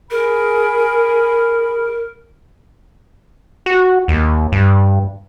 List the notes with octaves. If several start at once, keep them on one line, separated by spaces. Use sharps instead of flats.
G#4 A#4 B5
F#4
D#2
G2